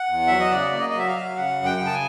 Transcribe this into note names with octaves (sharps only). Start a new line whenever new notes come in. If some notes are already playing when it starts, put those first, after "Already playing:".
Already playing: F#5
E2
F#3 E5
D#5
C#3 D5
A#3
D#5
D#5
F#3 E5
F5
F#3
C#3 F#5
F#2
G5
C#3
A5
G#5